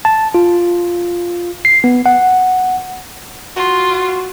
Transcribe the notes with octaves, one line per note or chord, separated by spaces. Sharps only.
A5
F4
C7
B3
F#5
F4 F#4